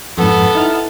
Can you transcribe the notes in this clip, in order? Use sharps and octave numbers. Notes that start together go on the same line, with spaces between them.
F2 G#2 B3 A4
D#4 E4 F6